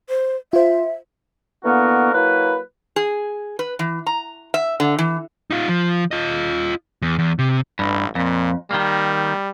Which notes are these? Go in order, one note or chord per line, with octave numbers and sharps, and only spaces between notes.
C5
F4 C5 E5
D3 E3 A#3 B3 F#4 A#4
F#3 A#3 E4 B4
G#4
B4
E3
A#5
E5
D3
E3
D#4 F4
F3
F4 D#5
E2
E2
C3
A1 G2
F2 A#2
D#3 G3 A#3